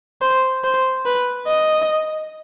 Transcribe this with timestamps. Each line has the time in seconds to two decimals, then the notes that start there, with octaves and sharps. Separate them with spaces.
0.22 C5
0.64 C5
1.06 B4
1.48 D#5